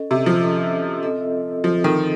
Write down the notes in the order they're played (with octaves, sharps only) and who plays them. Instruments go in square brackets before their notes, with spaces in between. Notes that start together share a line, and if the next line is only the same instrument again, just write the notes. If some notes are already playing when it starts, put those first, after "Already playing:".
Already playing: [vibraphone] C#4 A4 D#5
[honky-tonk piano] C3
F3
[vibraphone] C#4 A4 D#5
C4 F4 A4 D#5
[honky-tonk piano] F3 [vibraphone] C4 F4 A4 D#5
[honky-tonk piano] D#3